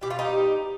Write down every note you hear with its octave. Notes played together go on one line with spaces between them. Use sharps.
B2 G3 G4
F4
D#4 G4